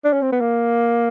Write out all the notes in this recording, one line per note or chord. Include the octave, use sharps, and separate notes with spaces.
D4
C#4
C4
B3
A#3